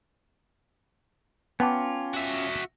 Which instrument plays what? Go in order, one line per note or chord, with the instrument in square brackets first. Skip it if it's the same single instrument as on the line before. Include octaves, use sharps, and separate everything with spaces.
[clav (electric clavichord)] B3 [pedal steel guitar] C#4 F4 [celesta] G5 A5 D6
[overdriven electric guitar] F#4 E5